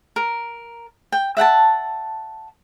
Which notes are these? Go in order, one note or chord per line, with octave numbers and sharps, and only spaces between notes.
A#4
G5
E5 F#5 G5 A5